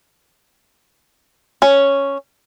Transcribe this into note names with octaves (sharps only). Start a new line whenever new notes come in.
C#4